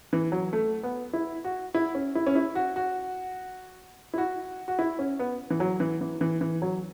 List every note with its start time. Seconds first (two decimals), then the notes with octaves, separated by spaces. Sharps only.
0.13 E3
0.32 F#3
0.53 A3
0.83 B3
1.13 E4
1.44 F#4
1.74 E4
1.95 C#4
2.15 E4
2.27 C#4
2.35 E4
2.55 F#4
2.76 F#4
4.14 E4
4.18 F#4
4.68 F#4
4.79 E4
4.99 C#4
5.19 B3
5.50 E3
5.60 F#3
5.80 E3
6.01 E3
6.21 E3
6.41 E3
6.62 F#3